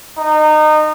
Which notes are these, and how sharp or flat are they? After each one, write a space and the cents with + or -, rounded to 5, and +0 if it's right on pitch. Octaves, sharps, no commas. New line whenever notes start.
D#4 -25